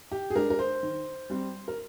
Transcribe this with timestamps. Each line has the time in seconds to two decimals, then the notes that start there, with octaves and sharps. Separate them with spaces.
0.12 G4
0.30 G#4
0.35 G#3 D4 A#4
0.50 A#4
0.59 C5
0.83 D#3
1.30 G3 C4
1.68 A#4